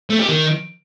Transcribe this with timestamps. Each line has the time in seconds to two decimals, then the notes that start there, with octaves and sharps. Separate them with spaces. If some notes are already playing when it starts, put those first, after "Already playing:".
0.10 A3
0.19 G4
0.29 D#3